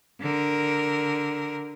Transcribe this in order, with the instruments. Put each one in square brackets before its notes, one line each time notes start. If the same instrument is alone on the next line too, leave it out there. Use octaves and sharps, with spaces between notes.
[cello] D3 A#4